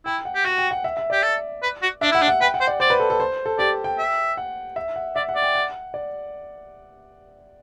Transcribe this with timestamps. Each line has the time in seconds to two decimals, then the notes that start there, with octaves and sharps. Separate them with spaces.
0.05 E4 G5
0.25 F#5
0.35 G4
0.45 F#4 F#5
0.58 G5
0.71 F#5
0.84 E5
0.97 E5
1.10 G4 D5
1.23 A4
1.63 B4
1.82 F#4
2.01 D4 E5
2.12 E4 F#5
2.22 D4
2.28 F#5
2.41 B4 G5
2.54 F#5
2.60 C5
2.67 D5
2.80 C5 D5
2.90 B4
3.00 A4
3.10 A4
3.20 C5
3.46 A4
3.58 G4 D5
3.84 G5
3.98 E5
4.37 F#5
4.76 E5
4.96 F#5
5.16 D5 E5
5.29 F#5
5.35 D5
5.42 G5
5.55 F#5
5.94 D5